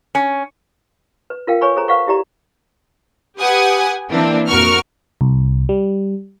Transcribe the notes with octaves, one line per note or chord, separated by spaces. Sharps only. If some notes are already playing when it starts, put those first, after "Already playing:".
C#4
B4
F4 A#4 F5 G5
B4 C#5 G#5 B5 C#6
G#4 A4 C5 A#5
B4 F5 F#5 C#6
E4 G4 D5 A#5
G4 B4 F#5 G#5 D#6
E3 A#3 C4 D4
F2 A#2 F#4 A#4 C#6 F6
C2
G3